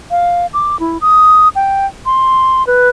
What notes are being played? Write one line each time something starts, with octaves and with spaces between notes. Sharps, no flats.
F5
D6
E4
D#6
G5
C6
B4